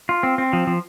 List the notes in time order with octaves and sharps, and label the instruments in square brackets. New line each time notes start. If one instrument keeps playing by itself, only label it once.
[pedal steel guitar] F4
C4
C4
F3
F3